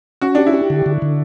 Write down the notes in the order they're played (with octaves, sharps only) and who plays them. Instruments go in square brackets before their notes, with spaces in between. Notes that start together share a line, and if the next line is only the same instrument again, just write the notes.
[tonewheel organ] C#4 [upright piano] F#4
[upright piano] D4 [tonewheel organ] G4
[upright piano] E4
[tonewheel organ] G4
D3
D3
D3